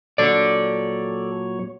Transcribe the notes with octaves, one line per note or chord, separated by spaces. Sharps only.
A#2 F#3 A4 C#5 D5